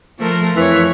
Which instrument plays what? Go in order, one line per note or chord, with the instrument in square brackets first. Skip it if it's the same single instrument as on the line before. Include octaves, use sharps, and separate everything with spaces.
[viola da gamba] F3 A3 A#4
[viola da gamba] F2 C#5 [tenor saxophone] E3